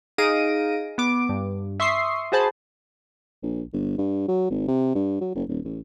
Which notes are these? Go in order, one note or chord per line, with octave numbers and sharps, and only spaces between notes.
D#4 G#4 F5 A#6 D7 D#7
B3 D6
G2
E5 C6 C#6 D#6 C7
F#4 G#4 C5 A5 B5
A#1
G1
G2
F#3
G#1
C3
G2
F#3
F#1
D#1
A1